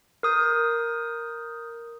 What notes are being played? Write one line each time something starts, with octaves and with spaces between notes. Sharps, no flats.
A#4 D#6 G6